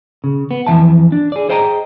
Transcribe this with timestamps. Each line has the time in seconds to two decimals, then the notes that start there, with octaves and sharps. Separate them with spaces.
0.24 C#3
0.51 B3
0.67 F2 E3 E5 A5
1.12 D4
1.32 G#4 D5
1.49 G#4 C5 D#5 G5 A5 A#5